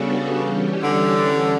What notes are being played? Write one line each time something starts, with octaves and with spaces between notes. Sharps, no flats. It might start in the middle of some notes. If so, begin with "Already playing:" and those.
Already playing: C#3 G3 B3 D4 F#4 A4
E3 G3 C#4 G4
D3
C#4